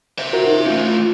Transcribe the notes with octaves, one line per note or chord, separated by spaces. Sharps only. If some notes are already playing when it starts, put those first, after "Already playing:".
C5 E5
F4 F#4 A#4
D#4
A3 C#4 F4